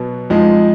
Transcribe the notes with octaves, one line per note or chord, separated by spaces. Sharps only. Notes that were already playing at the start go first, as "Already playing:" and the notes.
Already playing: B2 F#3 B3
F2 F3 G#3 D#4